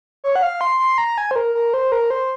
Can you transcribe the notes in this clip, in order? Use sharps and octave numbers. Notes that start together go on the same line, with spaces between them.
C#5
F#5
F5
C6
C6
A#5
G#5
C5
A#4
A#4
C5
A#4
C5